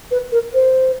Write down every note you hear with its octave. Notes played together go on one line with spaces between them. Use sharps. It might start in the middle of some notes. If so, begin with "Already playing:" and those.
B4
A#4
C5